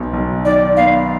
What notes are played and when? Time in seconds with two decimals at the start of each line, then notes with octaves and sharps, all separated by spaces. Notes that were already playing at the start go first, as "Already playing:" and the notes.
Already playing: B1 B2 B3
0.13 B1
0.45 D#3 D5
0.77 B3 F5